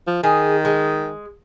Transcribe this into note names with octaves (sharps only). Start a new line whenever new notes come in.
F3
D#3 G#4
G#3